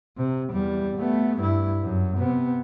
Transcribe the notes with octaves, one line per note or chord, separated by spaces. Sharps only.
C3
E2 G3
A3 B3
G2 E4
F#2
C3 B3